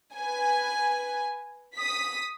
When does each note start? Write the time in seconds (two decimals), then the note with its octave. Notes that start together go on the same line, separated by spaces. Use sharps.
0.14 B4 G#5
1.76 D#6 B6